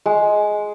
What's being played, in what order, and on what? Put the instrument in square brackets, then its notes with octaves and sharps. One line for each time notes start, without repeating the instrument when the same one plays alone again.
[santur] G#3